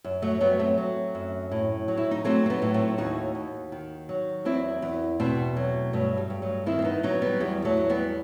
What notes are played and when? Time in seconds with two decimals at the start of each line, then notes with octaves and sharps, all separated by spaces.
0.04 F#2
0.22 F#3 A3
0.41 F#3 G3 B3
0.59 A3 C4
0.78 F#3
1.15 F#2
1.51 A2
1.88 F#3
1.97 E4
2.11 D#4
2.25 F#3 A3 C4
2.46 C4
2.50 B3 D#4
2.62 A2
2.74 A3 C4
2.98 D#2 D#4 F#4
3.35 D#2
3.72 D#3
4.09 F#3
4.45 E2 C4 E4
4.82 E2
5.20 B2 A3 C4
5.56 F#3
5.93 G2 F#3 A3
6.17 G3
6.30 G2
6.42 F#3 A3
6.66 D#3 C4 E4
6.79 C4
6.85 B3 D#4
7.03 F#3 B3 D#4
7.22 G3 B3
7.40 E2 G3
7.65 F#3 A3
7.77 E2
7.89 G3 B3